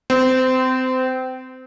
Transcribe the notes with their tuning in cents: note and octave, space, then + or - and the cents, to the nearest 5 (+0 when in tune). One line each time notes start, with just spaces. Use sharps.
C4 -25